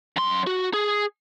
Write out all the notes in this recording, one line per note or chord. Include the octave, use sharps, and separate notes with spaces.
F#2 C6
F#4
G#4